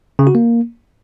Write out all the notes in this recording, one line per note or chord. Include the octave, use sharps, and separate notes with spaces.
C#3
F#4
A#3